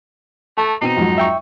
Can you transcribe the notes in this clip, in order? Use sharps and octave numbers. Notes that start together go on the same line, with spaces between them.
A3 A5
B2 C4 D#4 D#7
F2 G#2 F#3
E5 G5 C#6